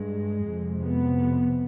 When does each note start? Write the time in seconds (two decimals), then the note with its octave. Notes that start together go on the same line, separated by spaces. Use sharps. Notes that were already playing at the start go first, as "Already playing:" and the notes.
Already playing: G2 G#3
0.46 F2 C3
0.82 B3